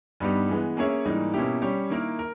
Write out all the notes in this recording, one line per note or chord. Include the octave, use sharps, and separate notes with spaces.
G2 G3 B3 D#4 G4
E3 G#3 B3
A#3 C#4 G#4 C#5 E5
G#2 E3 G3 A#3 D#4
B2 A#3 C#4 E4 G4
G3 C#4 G4 C#5
D#3 A#3 E4 A#4
A#4